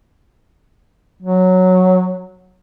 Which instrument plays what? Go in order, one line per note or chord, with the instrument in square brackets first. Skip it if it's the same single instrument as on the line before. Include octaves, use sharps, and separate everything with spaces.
[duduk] F#3